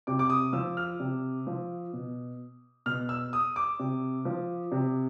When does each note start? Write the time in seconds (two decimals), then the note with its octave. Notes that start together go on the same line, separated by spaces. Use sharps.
0.07 C3 D6
0.19 D6
0.30 D#6
0.53 F3 E6
0.77 F6
1.00 C3
1.47 F3
1.93 B2
2.86 B2 F6
3.09 E6
3.33 D#6
3.56 D6
3.79 C3
4.25 F3
4.72 C3